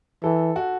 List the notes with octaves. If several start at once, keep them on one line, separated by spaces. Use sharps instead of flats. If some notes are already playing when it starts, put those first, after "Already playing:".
E3 A4
F#4